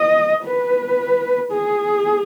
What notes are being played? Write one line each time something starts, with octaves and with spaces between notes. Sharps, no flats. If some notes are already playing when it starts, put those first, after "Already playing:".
Already playing: D#5
B4
G#4